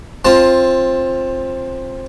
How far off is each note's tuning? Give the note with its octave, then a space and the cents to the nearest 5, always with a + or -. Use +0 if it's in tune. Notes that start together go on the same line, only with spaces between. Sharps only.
C4 +15 F4 +0 A5 +0